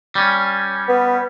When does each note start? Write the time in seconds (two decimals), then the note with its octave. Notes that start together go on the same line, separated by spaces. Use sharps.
0.15 G3 C#4
0.88 B3